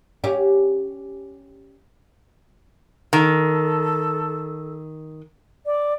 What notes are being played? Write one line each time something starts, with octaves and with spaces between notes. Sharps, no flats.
C#4 G4
D#3 A4
D5